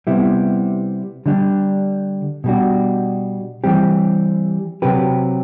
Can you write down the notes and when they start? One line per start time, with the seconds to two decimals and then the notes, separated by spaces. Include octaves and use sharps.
0.07 C3 G3 B3 E4
1.26 D3 G3 D4
2.44 B2 G3 D4 F#4
3.64 E3 G3 C4 G4
4.82 C3 F#3 C4 G4 B4